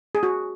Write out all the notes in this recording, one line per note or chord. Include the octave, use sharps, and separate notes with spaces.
G#4
F#4